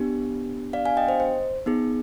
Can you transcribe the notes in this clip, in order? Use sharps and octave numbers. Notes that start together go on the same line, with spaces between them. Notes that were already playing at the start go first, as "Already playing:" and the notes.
Already playing: B3 D4 G4
D5 F5
F5 G#5
D#5 G5
C5 D#5
C5
B3 D#4 G#4